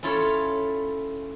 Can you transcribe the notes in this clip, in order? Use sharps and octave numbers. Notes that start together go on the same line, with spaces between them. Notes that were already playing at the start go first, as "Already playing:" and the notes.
C#4 E4 F4 A4 C#5